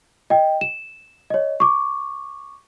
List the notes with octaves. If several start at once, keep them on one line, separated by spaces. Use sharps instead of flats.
D#5 G5
E7
C#5 D#5
C#6 D6